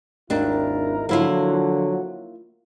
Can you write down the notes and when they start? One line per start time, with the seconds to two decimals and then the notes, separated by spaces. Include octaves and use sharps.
0.30 G#1 D#2 D4 E4 A#4
1.09 D3 F3 F#3 A#3 E4 F4